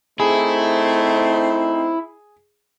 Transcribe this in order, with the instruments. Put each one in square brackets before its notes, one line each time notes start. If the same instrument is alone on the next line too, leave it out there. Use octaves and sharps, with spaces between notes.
[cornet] A3 [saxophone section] C4 D#4 C5 [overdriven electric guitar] E4 [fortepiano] G#4